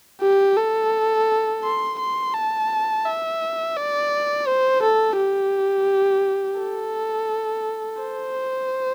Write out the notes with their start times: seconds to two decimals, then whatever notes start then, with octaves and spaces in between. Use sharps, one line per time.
0.22 G4
0.57 A4
1.64 C6
1.99 C6
2.34 A5
3.06 E5
3.77 D5
4.47 C5
4.83 A4
5.18 G4
6.60 A4
8.02 C5